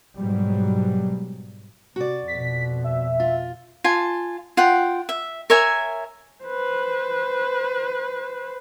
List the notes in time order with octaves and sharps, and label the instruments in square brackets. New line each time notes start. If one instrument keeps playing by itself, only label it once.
[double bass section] G#2 B2 F#3 G3
[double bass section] C3 [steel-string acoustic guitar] F#4 D5
[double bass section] F2 B2 [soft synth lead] B6
[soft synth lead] E5
[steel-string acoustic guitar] F4
[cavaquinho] F4 G#5 A5
F4 F#5 G5
E5
A#4 C#5 E5 G#5
[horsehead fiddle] B4 C5